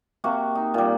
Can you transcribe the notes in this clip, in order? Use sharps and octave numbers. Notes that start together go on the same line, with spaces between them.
C3 A#3 F#4
D#4
A#2 G3